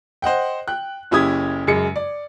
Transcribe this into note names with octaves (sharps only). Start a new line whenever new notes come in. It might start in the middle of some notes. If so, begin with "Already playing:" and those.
C5 D#5 F#5 G5
G5 F#6
F#1 C#4 E4 G4 D#6 G#6
F#2 C#3 G#3 C#7
D5